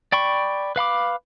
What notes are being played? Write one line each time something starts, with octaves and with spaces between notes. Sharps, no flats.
D5 G5 B5 C#6
B4 F5 B5 D6